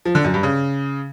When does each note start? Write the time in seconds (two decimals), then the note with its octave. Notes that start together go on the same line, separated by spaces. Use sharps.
0.05 F3
0.15 D3
0.24 F#2
0.34 G2
0.43 C#3